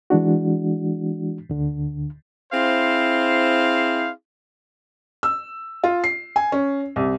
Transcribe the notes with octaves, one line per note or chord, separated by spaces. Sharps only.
E3 G#3 D4 F#4
D2 D3
C4 E4 G#4 C5 F5
E6
F4
C7
G#5
C#4
C2